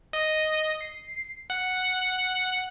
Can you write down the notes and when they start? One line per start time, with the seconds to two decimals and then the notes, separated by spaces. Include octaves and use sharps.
0.13 D#5
0.81 C7
1.50 F#5